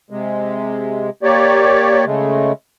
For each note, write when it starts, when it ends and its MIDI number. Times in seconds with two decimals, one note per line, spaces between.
0.10 1.10 48
0.10 1.10 56
1.23 2.05 58
1.23 2.05 67
1.23 2.05 73
1.23 2.05 74
2.06 2.52 49
2.06 2.52 56
2.06 2.52 57